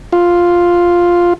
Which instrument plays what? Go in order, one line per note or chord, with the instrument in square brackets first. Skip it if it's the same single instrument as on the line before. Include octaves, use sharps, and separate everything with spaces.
[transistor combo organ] F4